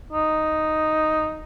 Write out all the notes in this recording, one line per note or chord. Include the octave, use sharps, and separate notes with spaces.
D#4